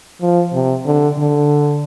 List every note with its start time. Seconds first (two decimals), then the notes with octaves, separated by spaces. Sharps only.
0.21 F3
0.53 C3
0.85 D3
1.18 D3